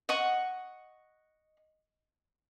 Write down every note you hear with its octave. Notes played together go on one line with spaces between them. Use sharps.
D#5 F#5 C#6